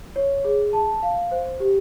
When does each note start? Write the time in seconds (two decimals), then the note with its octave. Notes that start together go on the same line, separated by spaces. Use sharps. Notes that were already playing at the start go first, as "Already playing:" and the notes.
0.16 C#5
0.44 G#4
0.73 A5
1.03 F5
1.31 C5
1.60 G4